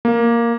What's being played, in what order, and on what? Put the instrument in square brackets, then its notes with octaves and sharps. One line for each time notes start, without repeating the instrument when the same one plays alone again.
[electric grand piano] A#3